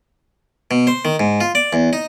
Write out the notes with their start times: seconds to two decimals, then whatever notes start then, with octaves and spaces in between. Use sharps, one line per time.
0.71 B2
0.87 C5
1.05 D#3
1.20 G#2
1.41 F4
1.55 D5
1.73 E2
1.93 D#4